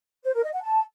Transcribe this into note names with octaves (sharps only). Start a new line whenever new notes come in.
C5
A#4
D#5
F#5
A5